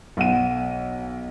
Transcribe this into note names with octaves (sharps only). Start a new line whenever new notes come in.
B1 F#5 D#7